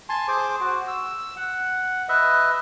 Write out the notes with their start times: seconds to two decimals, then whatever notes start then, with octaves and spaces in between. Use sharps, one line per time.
0.09 G#5 A5 C6
0.28 G#4 C5 D6
0.60 F#4
0.88 E6
1.37 F#5
2.09 B4 D#5 E5